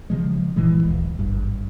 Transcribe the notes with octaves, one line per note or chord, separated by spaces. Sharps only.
C#3 F3 G#3
G1 A#2 E3 G#3
D1
G#1 G2